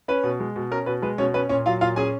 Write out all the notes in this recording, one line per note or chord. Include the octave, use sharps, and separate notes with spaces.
C#4 B4
B2
G#3
B2
C#4 A#4
B2 B4
G#3 B4
B2 C#4 C#5
C#4 B4
A#2 C#4 C#5
F#3 F4 F5
A#2 F4 F5
C#4 G#4 G#5